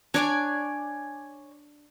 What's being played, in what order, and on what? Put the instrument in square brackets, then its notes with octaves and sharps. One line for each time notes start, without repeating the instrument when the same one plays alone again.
[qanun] D4 [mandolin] C#5 D5 G#5